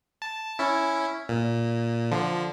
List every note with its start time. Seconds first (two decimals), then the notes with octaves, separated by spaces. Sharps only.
0.22 A5
0.59 C#4 E4
1.29 A#2
2.11 D3 F3